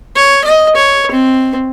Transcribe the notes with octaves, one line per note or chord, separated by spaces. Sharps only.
C#5
D#5
C#5
C4